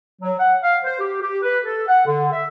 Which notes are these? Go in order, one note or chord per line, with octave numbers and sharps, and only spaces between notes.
F#3
F#5
F5
C5
G4
G4
B4
A4
F#5
D3
E5